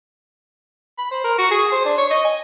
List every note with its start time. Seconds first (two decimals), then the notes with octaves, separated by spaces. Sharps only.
0.98 B5
1.11 C5
1.24 A#4
1.38 F#4
1.51 G#4
1.72 C5
1.85 D4
1.98 C#5
2.10 D#5
2.25 G#5